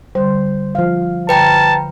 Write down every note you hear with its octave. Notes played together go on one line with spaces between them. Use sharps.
D3 G3 C5
F3 F5
D3 B4 G5 A5 A#5